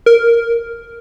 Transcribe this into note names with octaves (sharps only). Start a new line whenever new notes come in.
A#4